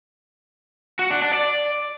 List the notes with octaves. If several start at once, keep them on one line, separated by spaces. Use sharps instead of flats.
F#4
D4
D4
D5